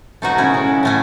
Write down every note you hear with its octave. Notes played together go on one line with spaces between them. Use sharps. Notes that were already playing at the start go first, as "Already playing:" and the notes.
B2 F#3 A3 D#4 F#4
C#4 E4
C#3 G#3
A2 A3 C#4